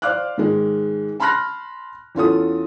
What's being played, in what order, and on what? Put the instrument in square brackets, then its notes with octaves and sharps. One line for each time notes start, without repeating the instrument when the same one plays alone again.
[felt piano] C5 D5 F5 D6 F6 F#6
G#2 D#3 G#3
A5 B5 C6 F6 F#6 A#6
E2 C#4 F4 A4 D#6